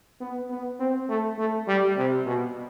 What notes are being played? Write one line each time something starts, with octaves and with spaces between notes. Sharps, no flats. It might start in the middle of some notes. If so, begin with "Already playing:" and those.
B3
B3
C4
A3
A3
G3
C3
B2